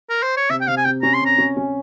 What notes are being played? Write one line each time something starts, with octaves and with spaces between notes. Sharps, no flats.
A#4
C5
C#5
C3 E5
G5
C3 F5
G#5
C3 G5
C#4 A#5
C6
C3
A#5
C#4
C#4